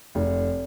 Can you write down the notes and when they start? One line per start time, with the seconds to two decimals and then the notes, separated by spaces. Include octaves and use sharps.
0.15 F1